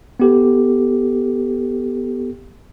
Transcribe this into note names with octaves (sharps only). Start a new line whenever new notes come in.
B3 G4 A4